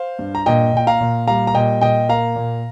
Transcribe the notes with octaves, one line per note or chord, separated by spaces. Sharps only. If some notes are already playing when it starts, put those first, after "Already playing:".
Already playing: C5 F5
G2
A#5
A#2 D#5 G5
A#2 G5
F5 A#5
A#2
G3 F5 A#5
A#5
A#2 D#5 G5
A#2 D#5 G5
A#3 F5 A#5
A#2